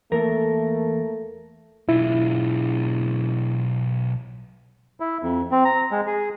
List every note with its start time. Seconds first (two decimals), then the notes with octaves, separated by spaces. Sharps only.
0.12 E2 A3 A#3 A4 A#4
1.89 B1 E4 F4
5.00 E4
5.23 F2
5.52 C4
5.65 A#5
5.91 G#3
6.07 G#4